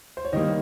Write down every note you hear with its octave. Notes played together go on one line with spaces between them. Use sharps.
C5
C#5
D#3 G3 A#3 D#5